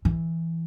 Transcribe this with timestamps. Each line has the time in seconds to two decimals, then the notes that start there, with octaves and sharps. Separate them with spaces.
0.05 E3